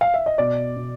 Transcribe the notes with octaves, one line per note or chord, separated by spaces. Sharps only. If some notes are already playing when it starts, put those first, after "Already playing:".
F5
E5
D#5
B2 D5
B2